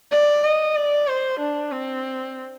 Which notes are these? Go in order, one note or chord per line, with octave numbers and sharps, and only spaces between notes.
D5
D#5
D5
C5
D4
C4